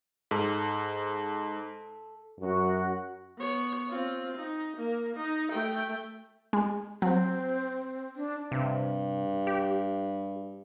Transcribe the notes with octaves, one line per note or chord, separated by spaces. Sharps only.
G#2 A4
F#2 F#4
B3 C#5
C4 F4
D#4
A#3
D#4
A3 G5
G#3
F#3 C4
D4
G2 C3
G4